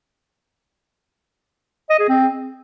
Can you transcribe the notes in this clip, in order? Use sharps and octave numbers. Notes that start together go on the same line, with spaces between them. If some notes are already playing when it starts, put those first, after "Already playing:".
D#5
G#4
C4